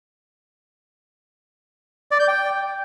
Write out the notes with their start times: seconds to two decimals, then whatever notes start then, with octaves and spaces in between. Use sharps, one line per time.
2.11 D5
2.20 G6
2.28 G5